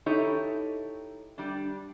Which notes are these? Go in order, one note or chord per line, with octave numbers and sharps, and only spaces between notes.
D#4 E4 G4 A4 C#5
G3 D4